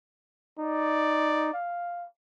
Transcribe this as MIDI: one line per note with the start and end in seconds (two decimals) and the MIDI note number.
0.59 1.50 63
0.59 1.59 74
1.53 2.06 77